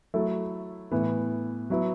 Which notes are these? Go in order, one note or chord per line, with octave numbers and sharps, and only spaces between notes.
F#3 A3 E4 A4
A2 E3 B3
F#3 B3 E4